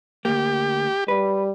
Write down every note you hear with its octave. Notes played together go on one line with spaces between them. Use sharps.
D2 A#3 G4
G3 B4